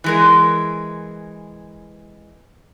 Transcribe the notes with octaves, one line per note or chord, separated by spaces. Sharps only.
E3 G#3 A#4